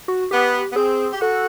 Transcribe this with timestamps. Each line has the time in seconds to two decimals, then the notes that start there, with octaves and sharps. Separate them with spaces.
0.08 F#4
0.31 B3 G4
0.72 B3
0.75 C4 G#4
1.12 G4
1.21 F#4 A4